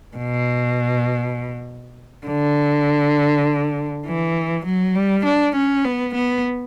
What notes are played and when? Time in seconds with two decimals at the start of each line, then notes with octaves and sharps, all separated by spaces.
0.17 B2
2.26 D3
4.07 E3
4.65 F#3
4.95 G3
5.25 D4
5.55 C#4
5.85 B3
6.15 B3